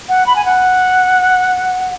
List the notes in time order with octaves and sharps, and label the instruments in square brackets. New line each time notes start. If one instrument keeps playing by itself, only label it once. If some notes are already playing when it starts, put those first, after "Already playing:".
[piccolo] F#5
B5
G#5
F#5